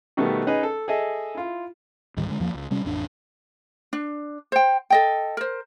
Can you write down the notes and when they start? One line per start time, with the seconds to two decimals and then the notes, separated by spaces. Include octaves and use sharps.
0.17 B2 D#3 G3 A3 B3
0.47 C#4 D#4 G#4 B4 D#5
0.63 A4
0.88 G#4 A4 D#5 E5
1.35 E4 F4
2.17 C#2 G#2 D#3 G3
2.29 D3 G#3
2.40 E2 F3 A#3
2.54 C#2
2.71 C3 G3 C#4
2.85 A1 F2 D4
3.93 D4
4.52 C5 G5
4.90 A4 D#5 G5
5.37 A#4 C5